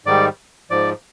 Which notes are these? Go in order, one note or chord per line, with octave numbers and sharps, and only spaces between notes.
G#2 D#3 G3 D5
G#2 F3 D5